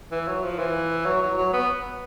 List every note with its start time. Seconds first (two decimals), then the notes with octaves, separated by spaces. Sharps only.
0.11 E3
0.28 F#3
0.43 F3
0.59 E3
1.06 F#3
1.22 F#3
1.37 F#3
1.53 B3